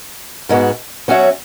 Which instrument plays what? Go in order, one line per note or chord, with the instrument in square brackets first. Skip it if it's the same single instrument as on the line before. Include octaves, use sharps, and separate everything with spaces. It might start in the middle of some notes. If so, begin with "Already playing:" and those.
[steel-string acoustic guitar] G#2 G#3 B3 F#4
F#3 C#4 F#4 E5